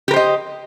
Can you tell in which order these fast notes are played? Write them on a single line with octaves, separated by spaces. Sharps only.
G4 A#4 C5 D#5